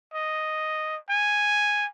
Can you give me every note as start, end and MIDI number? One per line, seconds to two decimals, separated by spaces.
0.14 0.97 75
1.10 1.87 80